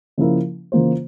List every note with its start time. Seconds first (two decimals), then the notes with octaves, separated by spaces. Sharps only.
0.18 C#3 F3 A#3 E4 A#4
0.72 C#3 E3 A#3 F4 C5